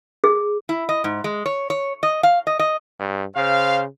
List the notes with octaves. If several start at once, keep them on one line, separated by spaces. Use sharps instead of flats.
G#4
E4
D#5
G#2
G#3
C#5
C#5
D#5
F5
D#5
D#5
G2
C#3 C5 F5